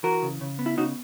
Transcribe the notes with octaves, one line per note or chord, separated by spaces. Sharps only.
E3 F#4 A#4
C#3
C#3
B3
E4
C#3 D#4 F#4